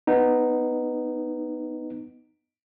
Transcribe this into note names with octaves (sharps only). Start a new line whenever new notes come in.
B3 D#4